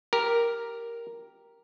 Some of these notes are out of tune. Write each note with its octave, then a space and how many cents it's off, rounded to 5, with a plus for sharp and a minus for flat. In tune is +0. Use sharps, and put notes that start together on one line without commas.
G4 +0 A#4 +0